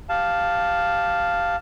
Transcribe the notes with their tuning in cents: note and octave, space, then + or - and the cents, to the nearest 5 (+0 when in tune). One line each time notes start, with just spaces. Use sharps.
G4 +0 F5 +0 A5 +0